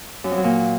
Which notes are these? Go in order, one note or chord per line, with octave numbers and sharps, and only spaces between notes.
F#2
F2
F#3
A#2